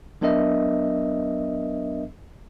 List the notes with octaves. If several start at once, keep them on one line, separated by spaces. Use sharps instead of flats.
F#3 B3 D4 A#4 D#5 E5